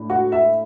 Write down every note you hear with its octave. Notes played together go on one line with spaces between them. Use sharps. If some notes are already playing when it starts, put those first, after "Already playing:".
Already playing: A2 D4
F#4
E5